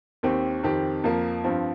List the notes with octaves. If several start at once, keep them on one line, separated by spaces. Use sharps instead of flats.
D#2 D#3 C4 G4
F2 D#3 C4 G4
F2 F3 A#3
G2 F3 C4 F4